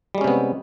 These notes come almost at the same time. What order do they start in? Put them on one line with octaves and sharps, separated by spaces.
G3 G#3 C#4 C3 B3